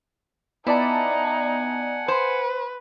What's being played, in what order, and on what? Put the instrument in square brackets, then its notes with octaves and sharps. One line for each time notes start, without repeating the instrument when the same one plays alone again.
[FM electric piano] B3 D5 A5 [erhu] D#4 [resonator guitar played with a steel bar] E4 [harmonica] F#5 G#5
[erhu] B4 [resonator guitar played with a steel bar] C5